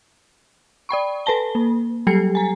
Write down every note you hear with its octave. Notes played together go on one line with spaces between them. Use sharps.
D5 G5 B5 C#6
A4 B4 G#5 A5 G7
A#3
F#3 G3 G4 A4 C7 C#7
G#5 A#5